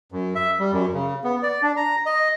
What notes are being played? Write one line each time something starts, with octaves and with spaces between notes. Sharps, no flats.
F#2
E5
G3
F#2
C#3
B3
D5
D4
A#5
D#5